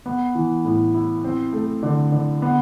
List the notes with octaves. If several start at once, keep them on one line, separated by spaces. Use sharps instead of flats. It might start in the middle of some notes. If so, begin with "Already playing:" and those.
B3
E3
A2
E4
C4
A3
D3
D3
B3